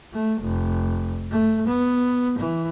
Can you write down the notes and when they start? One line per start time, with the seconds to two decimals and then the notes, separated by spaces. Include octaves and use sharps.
0.13 A3
0.42 F1
1.31 A3
1.67 B3
2.39 E3